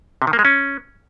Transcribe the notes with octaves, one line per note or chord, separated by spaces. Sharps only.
C3
D#3
A#3
G#3
C#4